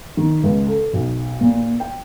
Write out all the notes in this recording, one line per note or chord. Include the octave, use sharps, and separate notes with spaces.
D#3
C#2
A4
B1
A#2
G5